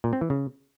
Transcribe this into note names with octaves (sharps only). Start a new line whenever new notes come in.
A#2
C4
E3
C#3